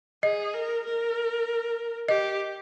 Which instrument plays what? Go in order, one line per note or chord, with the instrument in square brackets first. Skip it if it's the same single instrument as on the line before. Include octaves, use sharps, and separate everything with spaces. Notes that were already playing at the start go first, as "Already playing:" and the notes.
[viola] G#4 [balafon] D#5
[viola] A#4
A#4
[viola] G4 [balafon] D#5